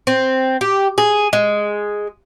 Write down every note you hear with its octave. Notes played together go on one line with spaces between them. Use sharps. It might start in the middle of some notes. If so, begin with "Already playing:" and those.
C4
G4
G#4
G#3